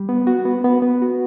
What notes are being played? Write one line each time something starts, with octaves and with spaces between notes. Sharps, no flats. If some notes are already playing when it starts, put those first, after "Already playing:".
Already playing: G3
B3
F#4
B3
B3
B3
F#4